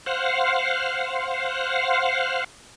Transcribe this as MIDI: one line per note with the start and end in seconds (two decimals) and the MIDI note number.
0.06 2.44 72
0.06 2.44 77
0.06 2.44 78